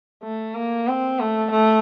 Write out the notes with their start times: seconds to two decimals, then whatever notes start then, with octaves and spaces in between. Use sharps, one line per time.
0.23 A3
0.55 A#3
0.88 C4
1.20 A3
1.51 A3